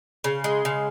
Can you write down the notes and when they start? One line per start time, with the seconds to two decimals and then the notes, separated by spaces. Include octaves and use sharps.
0.24 C#3
0.44 G#3
0.65 C#3